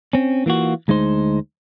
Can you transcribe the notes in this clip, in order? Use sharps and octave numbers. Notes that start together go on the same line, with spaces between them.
C4 C#4
E3 A#3 F4 F#4
D2 G#3 D#4 C5